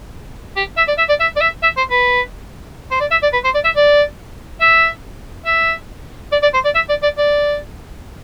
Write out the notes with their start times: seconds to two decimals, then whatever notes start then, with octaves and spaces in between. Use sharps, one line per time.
0.56 G4
0.77 E5
0.87 D5
0.98 E5
1.09 D5
1.20 E5
1.36 D5
1.41 E5
1.63 E5
1.77 C5
1.90 B4
2.91 C5
3.00 D5
3.11 E5
3.22 D5
3.33 B4
3.44 C5
3.54 D5
3.64 E5
3.76 D5
4.61 E5
5.46 E5
6.32 D5
6.42 D5
6.54 C5
6.64 D5
6.75 E5
6.89 D5
7.03 D5
7.18 D5